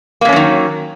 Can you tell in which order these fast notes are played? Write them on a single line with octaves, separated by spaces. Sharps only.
A#3 C3 C#4 F#3 D#3